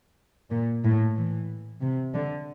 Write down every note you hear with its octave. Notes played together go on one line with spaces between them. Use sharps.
A#2
A2
E3
C3
D3